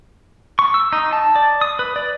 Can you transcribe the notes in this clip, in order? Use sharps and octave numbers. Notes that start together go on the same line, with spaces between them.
C#6
E6
D#4
A5
D5
D#6
B4
D5